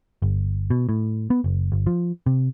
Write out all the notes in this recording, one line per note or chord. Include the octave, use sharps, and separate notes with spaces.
G1
B2
A2
B3
F#1
G1
F3
C3